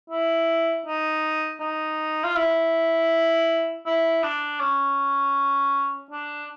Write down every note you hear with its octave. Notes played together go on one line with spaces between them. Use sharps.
E4
D#4
D#4
F4
E4
E4
D4
C#4
D4